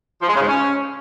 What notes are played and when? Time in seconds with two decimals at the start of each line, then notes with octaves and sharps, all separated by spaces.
0.22 F3
0.28 G#3
0.35 C#3
0.42 G#2
0.48 C#4